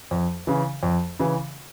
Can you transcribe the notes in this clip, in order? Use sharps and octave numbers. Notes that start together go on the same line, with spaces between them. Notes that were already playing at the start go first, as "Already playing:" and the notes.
F2
C#3 E3
F2
C#3 E3